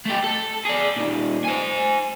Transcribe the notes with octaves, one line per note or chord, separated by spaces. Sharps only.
A3 G4
A4
G#4 D5
A#2 D#3
C5 G#5